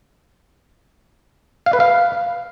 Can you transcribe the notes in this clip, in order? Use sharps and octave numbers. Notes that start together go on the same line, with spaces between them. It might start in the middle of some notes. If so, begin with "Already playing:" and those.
F5
B4
F5